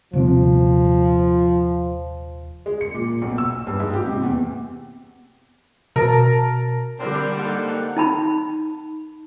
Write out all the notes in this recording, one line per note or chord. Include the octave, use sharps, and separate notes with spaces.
D#1 C3 F3 C4
G#3
C#7
A#2
B1
E6
G2
G#2
G4
C3
E2
B2 A#4 A5
D3 G3 C4 D4 A#4 C5 G5
A#3 D#4 A4 F#5
D#4 A5 B5